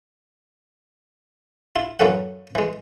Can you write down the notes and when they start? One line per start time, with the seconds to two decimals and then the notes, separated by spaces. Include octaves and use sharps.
1.76 E4 F4
1.99 F#2 E3 A#3 C#4 A4 F#5
2.55 E3 G#3